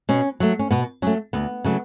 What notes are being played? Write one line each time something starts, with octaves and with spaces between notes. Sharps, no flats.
B2 C#4
F#3 A3
C#4
B2 B3
F#3 A3 C#4
D2 B3
C#3 F#3 A3